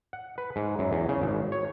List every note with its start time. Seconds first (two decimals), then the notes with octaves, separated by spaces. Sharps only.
0.13 F#5
0.38 B4
0.56 G#2
0.79 F#2
0.92 E2
1.09 C#3
1.22 G#1
1.52 C#5